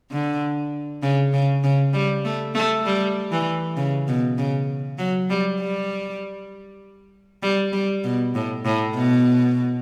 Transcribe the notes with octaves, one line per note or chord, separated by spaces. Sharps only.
D3
C#3
C#3
C#3
G3
A3
A3
G3
E3
C#3
B2
C#3
F#3
G3
G3
G3
G3
B2
A2
A2
B2